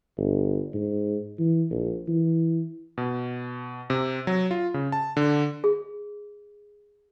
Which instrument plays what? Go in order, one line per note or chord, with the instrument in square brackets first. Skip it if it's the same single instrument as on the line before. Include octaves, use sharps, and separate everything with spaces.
[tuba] G1
G#2
E3
A#1
E3
[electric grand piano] B2
C3
F#3
F4
C#3
A5
D3
[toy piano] G#4